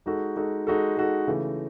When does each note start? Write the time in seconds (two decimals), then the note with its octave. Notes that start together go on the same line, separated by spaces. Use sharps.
0.06 G#3 D#4 F#4 A4
0.36 G#3 D#4 F#4 A4
0.67 G#3 D#4 F#4 A4
0.97 G#3 D#4 F#4 A4
1.27 C#3 E3 A3